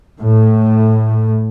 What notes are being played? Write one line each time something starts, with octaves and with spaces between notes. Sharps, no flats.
A2